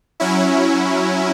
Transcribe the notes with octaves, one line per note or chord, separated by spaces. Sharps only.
F#3 C#4 E4